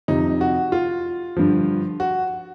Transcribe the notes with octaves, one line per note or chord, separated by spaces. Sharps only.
F2 C3 F3 D#4
F#4
F4
G2 D3 F3
F#4